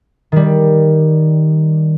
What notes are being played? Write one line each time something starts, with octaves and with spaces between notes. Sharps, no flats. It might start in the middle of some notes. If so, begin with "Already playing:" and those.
D#3 G3